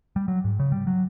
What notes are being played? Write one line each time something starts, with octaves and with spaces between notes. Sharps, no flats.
G3
F#3
G#2
C#3
G3
F#3